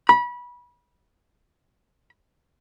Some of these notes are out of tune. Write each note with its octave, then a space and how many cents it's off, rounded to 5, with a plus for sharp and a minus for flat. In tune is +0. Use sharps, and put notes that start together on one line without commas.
B5 -25